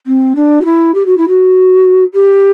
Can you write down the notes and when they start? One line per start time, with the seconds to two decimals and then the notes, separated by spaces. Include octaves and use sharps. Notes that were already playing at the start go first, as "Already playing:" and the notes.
0.07 C4
0.36 D4
0.61 F#4
0.65 E4
0.95 G4
1.06 F#4
1.17 E4
1.28 F#4
2.14 G4